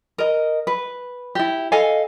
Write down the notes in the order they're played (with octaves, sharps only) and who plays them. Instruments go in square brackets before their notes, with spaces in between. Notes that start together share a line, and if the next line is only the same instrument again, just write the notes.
[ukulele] A#4 D#5
B4
E4 G4
A4 D#5 F5 G#5